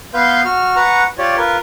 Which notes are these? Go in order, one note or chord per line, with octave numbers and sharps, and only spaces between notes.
B3 B4 F5 C6 G6
F#4 F6
B4 F#5 A#5 C#6
F4 G4 C#5 D5
F4 A#4 B4